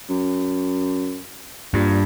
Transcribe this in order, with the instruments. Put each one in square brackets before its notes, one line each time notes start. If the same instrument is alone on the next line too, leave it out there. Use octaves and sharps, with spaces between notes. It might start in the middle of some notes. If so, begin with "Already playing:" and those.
[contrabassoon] F#2
[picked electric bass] G2 [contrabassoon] A#2